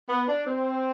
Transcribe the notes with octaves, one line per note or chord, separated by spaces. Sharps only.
B3
D4
C4